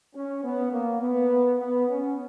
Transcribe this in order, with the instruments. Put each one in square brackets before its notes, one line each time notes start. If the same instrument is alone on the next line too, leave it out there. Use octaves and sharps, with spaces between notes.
[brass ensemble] C#4
B3
A#3
B3
B3
C#4